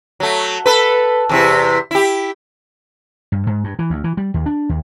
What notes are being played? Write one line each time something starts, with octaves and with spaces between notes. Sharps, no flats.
F#3 A3
A4 B4
E2 C3 E4
E4 G4
G2
G#2
G2
E3
D2
E3
G3
D#2
D4
D#2